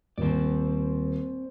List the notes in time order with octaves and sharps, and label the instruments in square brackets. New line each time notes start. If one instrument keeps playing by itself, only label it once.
[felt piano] D#1 [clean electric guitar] C4 D5